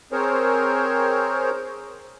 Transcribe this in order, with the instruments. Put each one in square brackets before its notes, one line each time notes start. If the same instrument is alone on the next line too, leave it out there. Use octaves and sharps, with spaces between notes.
[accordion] C4 G#4 A#4 C5 C#5